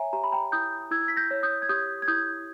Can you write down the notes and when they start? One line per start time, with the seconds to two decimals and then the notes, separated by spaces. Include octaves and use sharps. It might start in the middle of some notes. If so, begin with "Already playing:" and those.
Already playing: C#5 E5 G#5 A#5
0.13 G4 A#5
0.23 B5
0.32 G5 A#5
0.52 E4 D#6 G6
0.91 E4 E6 G#6
1.08 B6
1.17 G6 A#6
1.31 C#5
1.43 D#6 G6
1.62 G#6
1.69 G4 D#6 G6
2.02 G#6
2.08 E4 D#6 G6